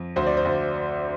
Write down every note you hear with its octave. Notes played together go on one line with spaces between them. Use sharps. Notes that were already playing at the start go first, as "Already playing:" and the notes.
Already playing: F2
D2 C5
D5
C5
D2